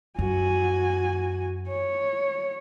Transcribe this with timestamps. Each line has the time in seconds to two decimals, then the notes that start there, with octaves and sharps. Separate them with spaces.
0.19 F#2 F#4 G#5
1.69 C#5